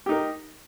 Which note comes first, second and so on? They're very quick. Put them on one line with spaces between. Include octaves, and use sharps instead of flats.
G4 D#4 A#4